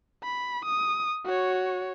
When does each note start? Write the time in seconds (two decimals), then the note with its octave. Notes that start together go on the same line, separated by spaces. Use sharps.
0.23 B5
0.66 D#6
1.25 F#4 C#5